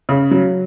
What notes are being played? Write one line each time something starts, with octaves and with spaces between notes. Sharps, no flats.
C#3
F#3